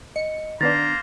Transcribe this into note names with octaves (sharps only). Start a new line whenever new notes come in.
D#5 C#7
D#3 A#3 B3 D4 C5 A#5 A6